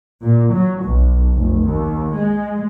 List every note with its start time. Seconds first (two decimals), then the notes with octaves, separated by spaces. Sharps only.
0.23 A#2
0.53 F#3
0.83 B1
1.36 F1
1.66 D#2
2.14 G#3